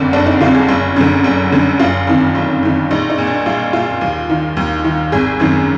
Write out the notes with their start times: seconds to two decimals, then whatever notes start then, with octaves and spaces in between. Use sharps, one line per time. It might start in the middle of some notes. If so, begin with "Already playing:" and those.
Already playing: F#1 F2 D3 A#3
0.13 F#1 D4
0.26 D#4
0.41 F2 D3 F4
0.55 G#4
0.69 F#1
0.96 F#2 D3
1.24 F#1
1.52 F#2 D3
1.79 F#1 F4
2.07 F2 D#3
2.35 F#1
2.63 F2 D#3
2.91 A#1 D#4
3.10 D#4
3.18 A#2
3.27 D4
3.46 A#1 F4
3.73 A#2 F4
4.01 D#2
4.29 D#3
4.57 D#2
4.84 D#3
5.12 G#1 G#4
5.40 F#2 D#3